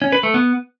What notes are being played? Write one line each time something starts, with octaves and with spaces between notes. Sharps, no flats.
C#4
B4
A3
B3